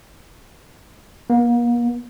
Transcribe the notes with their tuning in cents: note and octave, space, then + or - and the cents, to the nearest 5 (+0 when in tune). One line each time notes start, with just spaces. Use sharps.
A#3 +40